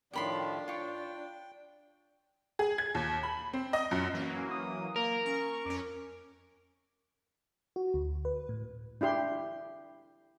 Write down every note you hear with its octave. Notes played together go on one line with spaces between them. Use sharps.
A2 D#3 F3 D4 G4 B5 C6
F4 C#5 G5
G#4
G#6
D#2
B5
C4
D#5
F#2
E3 F#3 A#3
C#4
D#6
A#3 A#4
C#4 C#6
F2 C#4 D6
F#4
D2
B4
A2
D4 E4 G4 C6